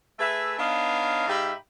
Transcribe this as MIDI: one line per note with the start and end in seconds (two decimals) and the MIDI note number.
0.19 0.55 57
0.19 0.55 68
0.19 0.55 71
0.19 0.55 76
0.58 1.28 59
0.58 1.28 62
0.58 1.28 63
0.58 1.28 73
0.58 1.28 77
1.28 1.52 44
1.28 1.52 63
1.28 1.52 67
1.28 1.52 76
1.28 1.52 77
1.28 1.52 83